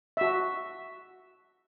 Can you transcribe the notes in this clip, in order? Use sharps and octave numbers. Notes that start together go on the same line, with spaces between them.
F#4 E5